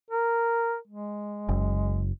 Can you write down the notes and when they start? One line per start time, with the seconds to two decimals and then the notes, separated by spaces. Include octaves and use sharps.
0.10 A#4
0.87 G#3
1.49 F#1